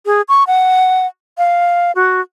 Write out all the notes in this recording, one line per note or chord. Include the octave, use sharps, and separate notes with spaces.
G#4
C#6
F#5
F5
F#4